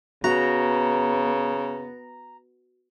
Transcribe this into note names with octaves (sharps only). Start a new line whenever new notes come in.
C#3 B3 F#4 A#5